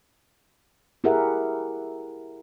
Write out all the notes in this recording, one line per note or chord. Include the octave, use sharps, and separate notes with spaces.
E4 G4 G#4 A#4 E5 F#5